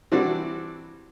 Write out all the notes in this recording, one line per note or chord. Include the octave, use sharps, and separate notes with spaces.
E3 G3 C4 D4 F#4